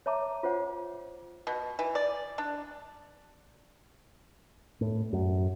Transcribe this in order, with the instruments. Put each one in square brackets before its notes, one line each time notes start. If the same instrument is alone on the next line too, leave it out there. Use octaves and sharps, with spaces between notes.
[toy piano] C#5 E5 A5 A#5 D6
F4 C5 C#5 F#5
[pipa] B2
E3
D5
D4
[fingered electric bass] A2
F#2